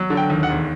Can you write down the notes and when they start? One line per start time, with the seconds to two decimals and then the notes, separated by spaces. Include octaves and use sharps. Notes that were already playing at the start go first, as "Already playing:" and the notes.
Already playing: F#3
0.10 D3
0.17 G5
0.30 D#2
0.43 F#5
0.49 E1